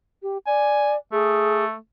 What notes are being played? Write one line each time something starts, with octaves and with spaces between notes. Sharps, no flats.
G4
D5 G#5
A3 G#4